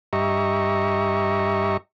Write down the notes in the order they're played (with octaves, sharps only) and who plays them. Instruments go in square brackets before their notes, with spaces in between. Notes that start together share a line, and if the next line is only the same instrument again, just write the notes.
[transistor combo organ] G2 G4 D#5 E5 A#5 C#6